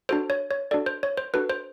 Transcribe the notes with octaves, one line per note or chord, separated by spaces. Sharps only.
D4 F#4 A4 C5
C#5
C#5
D4 F#4 A4 D5
C5
C#5
C5
D4 F#4 A4 B4
C5